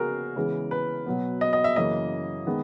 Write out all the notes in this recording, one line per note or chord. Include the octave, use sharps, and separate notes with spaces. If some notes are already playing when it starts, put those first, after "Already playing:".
Already playing: C#3 G#3 B3 F#4 G#4 A#4
C#3 E3 G#3 B3
B4
B2 F#3 B3
D#5
D#5
E5
F#2 C#3 E3 A#3 D#5
D#3 G#3 B3